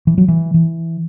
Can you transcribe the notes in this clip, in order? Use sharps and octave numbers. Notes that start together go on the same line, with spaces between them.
E3
F#3
E3
E3